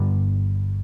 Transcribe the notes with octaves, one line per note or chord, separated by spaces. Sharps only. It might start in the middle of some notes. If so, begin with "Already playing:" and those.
Already playing: G1 G2 D3 G3